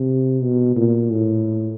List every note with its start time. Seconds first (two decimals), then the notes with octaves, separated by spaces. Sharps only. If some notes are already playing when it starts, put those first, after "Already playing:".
Already playing: C3
0.42 B2
0.76 A#2
1.10 A2